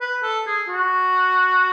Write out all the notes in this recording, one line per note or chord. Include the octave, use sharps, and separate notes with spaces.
B4
A4
G#4
F#4